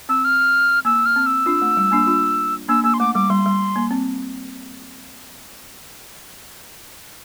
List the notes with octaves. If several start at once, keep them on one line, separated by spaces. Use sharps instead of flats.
C4 E6
F6
A#3 E6
F6
C4
E6
D4 F4
A3
G3
A#3 D4
D4 F4
A#3 D4 E6
A#3 E6
C6
A3 D6
G3 D6
G3 C6
G3
A#3
C4